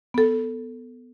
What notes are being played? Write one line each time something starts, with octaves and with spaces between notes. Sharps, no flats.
B3 A4